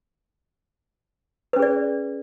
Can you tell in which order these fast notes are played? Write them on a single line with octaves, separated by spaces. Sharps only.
B4 C#4 G#4 D5